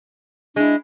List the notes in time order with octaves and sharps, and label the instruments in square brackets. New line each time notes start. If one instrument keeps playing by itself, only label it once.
[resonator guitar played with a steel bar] G#3 E4 [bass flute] D4